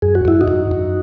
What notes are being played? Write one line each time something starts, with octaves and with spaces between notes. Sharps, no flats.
F#2 G#4
F#4
F#2 E4
D#4 F#4
F#2
F#2